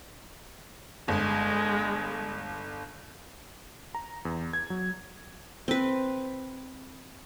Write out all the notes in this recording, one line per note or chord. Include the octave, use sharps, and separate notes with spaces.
G1 G#3
A#5
E2
G#6
F#3
C4 B4